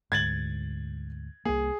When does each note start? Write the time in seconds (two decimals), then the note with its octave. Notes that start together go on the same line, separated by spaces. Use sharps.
0.12 D2 G#2 G#6 A6 F#7
1.45 C2 A#3 G#4